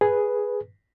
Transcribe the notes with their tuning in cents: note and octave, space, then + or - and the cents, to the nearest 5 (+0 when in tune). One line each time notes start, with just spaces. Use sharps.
G#4 +0 B4 +0